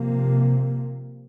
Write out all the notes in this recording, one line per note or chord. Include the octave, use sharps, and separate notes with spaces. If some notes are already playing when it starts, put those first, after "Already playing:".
Already playing: C3 F3 A#3